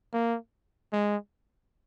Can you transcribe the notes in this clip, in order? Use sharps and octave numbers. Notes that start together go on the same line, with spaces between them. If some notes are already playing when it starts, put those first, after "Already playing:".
A#3
G#3